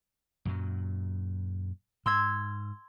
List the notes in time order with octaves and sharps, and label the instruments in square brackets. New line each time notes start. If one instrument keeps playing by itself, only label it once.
[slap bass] F#2 A#2 F#3
[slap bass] G#2 [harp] C6 E6 G#6